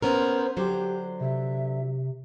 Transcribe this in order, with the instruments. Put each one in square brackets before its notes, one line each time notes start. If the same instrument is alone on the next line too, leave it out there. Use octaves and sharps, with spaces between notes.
[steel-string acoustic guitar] B3 C#4 A#4 [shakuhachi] C5
[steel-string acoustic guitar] D3 F#3 C5 [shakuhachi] G4
[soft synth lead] C3 [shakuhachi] E5